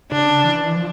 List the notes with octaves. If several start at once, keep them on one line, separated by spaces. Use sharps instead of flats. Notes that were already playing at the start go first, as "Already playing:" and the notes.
C#3 D4
E3
F3